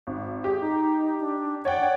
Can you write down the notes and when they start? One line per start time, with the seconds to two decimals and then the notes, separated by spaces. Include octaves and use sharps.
0.07 G#1
0.44 G4 G#4
0.60 D#4
1.20 D4
1.65 C#5 D5 F#5 G5